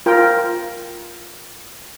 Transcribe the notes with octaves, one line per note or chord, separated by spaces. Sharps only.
F4 A#4 G5